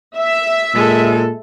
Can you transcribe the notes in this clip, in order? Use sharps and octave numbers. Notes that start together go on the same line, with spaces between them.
E5
A#2 G#3 A4